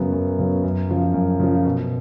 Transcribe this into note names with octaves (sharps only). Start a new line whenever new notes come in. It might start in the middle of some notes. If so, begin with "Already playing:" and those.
Already playing: F#2 C#3 F#3 B3
F#2
C#3 F#3 B3
F#2
C#3 F3
F#2
C#3 F3
B2